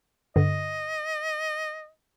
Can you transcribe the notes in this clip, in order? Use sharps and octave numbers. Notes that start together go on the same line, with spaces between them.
G2 D3 D#5